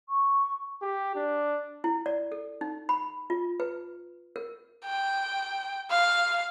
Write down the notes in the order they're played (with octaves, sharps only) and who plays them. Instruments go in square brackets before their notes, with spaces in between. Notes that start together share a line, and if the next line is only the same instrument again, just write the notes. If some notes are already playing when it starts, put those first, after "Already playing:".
[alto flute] C#6
[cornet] G4
D4
[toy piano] E4
D5
A4
D#4
B5
F4
B4
A#4
[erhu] G5
F5